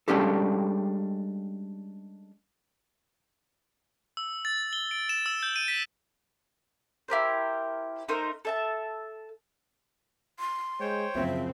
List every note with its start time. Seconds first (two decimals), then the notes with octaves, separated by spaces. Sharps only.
0.08 G3 G#3 C#4 D4 G4 A4
4.17 E6
4.45 A6
4.73 G7
4.91 D7
5.09 E7
5.26 E6
5.43 G6
5.56 D#7
5.68 B6
7.08 E4 G4 A#4 C5
8.08 A3 D#4 A#4 C5
8.45 A4 E5 A5
10.39 C6
10.80 G#3 C5 C#5 G5
11.15 F#2 C#3 F3 C4 E5